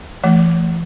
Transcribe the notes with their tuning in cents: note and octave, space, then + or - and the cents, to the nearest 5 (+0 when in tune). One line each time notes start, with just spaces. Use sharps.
E3 +40 A3 +0